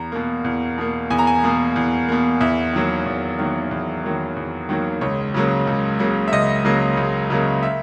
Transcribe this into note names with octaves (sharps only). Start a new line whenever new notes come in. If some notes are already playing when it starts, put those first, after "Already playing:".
Already playing: E2 A#5
B2 A#3
E2
B2 A#3
E2 G#5
A#5
G#5
B2 A#3
E2
B2 A#3
E2 E5
D#3 F#3 A#3
E2
D#3 F#3 A#3
E2
D#3 F#3 A#3
E2
D#3 F#3 A#3
C#2 C#5
C#3 F#3 A#3
C#2
C#3 F#3 A#3
E5
C#2 D#5
C#3 F#3 A#3
C#2
C#3 F#3 A#3
E5